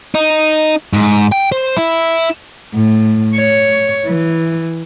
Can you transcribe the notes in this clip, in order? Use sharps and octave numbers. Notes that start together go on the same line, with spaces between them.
D#4
G#2
G5
C5
E4
A2
C#5
E3